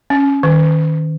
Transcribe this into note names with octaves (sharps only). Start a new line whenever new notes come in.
C#4
D#3